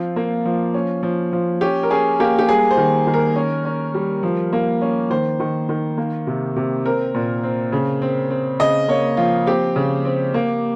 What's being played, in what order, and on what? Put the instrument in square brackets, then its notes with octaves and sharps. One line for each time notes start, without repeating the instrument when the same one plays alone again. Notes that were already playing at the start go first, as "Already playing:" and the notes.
Already playing: [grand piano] F3 C4 F4
A#3
F3
C#4
F3
F3
C#4 G4
A#4
C#4 G#4
A#3 G4
G4
G3 G#4
C5
D#3
D#3
A#4
C#4
C#4
G3
F3
A#3
C#4
D#3 C5
D#3
D#3
A#3
C3
C3
C4 A#4
A#2
C4
C#3
C4
C4
C#3 D#5
A#3 C#5
F3 F4
C4 G4
C#3
C4
A#3